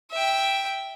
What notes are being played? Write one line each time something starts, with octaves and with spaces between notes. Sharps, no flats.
E5 G5